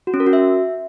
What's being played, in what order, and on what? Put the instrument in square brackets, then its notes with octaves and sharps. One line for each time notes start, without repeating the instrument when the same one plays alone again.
[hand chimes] F#4
C#4
A#4
F#4
E5